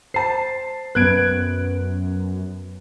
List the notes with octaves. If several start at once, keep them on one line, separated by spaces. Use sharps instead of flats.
C5 A5 C7
F#2 B3 B4 F#6 G#6 D7